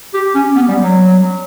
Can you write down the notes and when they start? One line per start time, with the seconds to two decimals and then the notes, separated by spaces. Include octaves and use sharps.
0.14 G4
0.35 C#4
0.56 B3
0.69 G3
0.83 F#3